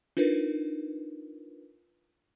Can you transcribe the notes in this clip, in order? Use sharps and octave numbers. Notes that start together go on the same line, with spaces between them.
D4 D#4 F4 A#4 B4